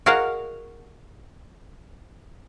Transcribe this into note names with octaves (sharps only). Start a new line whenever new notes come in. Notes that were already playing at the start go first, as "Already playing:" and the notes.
F#4 G#4 A#4 D#5 F5 F#5